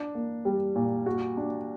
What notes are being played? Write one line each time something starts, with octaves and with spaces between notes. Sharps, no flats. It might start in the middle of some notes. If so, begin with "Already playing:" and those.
Already playing: D4
A#3
G3
A#2
F#4
D4